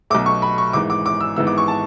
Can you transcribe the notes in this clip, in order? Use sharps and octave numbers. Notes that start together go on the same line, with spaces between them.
B1 B2 A3 D6
C#6
B5
C#6
G#1 G#2 E3 D6
D6
D6
E6
G#1 G#2 E3 B3 E4 E6
D6
C#6
A5